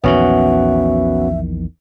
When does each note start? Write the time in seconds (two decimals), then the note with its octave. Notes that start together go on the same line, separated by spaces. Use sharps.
0.04 A#1 E2 D#3 B3 C#4 F#4 E5